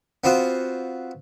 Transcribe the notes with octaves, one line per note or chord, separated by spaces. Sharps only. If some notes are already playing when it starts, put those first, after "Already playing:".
B3 C4 F4 F#4